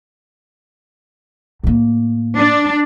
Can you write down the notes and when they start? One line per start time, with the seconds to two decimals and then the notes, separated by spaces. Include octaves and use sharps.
1.64 A2 A#3
2.36 D4